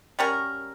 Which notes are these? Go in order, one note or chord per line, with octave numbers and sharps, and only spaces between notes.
G3 C#4 F#4 A#4